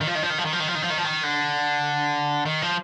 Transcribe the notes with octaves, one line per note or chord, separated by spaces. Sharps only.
D#3
F3
D#3
F3
D#3
F3
D#3
F3
D#3
F3
D#3
F3
D#3
F3
D#3
D3
D#3
F3